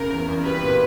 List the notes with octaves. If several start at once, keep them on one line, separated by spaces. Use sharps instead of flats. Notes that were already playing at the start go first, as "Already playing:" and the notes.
Already playing: C#3 A#4
E2
E2
G3 B4
A#2